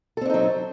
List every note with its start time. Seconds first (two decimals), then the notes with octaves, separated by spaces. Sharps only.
0.17 A4
0.21 C4
0.26 D4
0.30 D#4
0.34 F#3